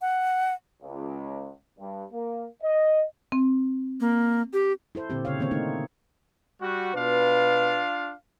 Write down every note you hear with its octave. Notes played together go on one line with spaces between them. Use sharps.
F#5
C#2
G2
A#3
D#5
C4
A#3
G4
E4 A4 C5
A#2 D3 C4 G4
C#3 C5 C#5 F5
D#3 A#3 C4 C#5
A3 C4 D#4
G3 F#4
B2 D4 F4 B4 F5